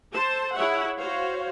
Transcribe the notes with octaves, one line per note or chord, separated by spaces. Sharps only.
A4 C5 A5
E4 G#4 C#5 E5 F#5
F#4 C5 C#5 F5